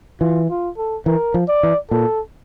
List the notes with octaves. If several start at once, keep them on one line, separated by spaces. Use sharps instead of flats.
E3 F4
F4
A4
E3 A#4
F3
D5
E3
A#2 A4